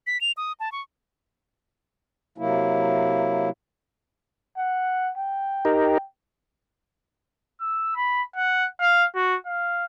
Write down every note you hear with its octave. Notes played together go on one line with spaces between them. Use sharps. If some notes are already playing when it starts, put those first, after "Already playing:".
B6
F7
D#6
A5
C#6
C3 F#3 A#3 E4
F#5
G5
D#4 G4 A#4
E6
B5
F#5
F5
F#4
F5